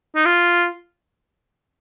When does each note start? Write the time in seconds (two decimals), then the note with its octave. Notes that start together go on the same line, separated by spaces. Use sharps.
0.16 D#4
0.25 F4